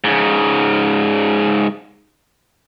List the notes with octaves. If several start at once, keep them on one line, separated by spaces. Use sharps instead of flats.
G#2 C#3